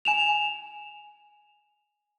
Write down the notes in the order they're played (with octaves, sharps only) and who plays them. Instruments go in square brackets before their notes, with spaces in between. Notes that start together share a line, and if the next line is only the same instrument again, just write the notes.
[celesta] G#5 E7 F7